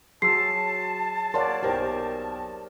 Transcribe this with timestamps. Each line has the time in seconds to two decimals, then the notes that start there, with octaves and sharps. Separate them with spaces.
0.22 F#3 F#4 G#4 A5 C6 E6 C7
1.34 A#4 C#5 D5 F5 F#5 C6
1.63 B1 G4 A#4 C5 G5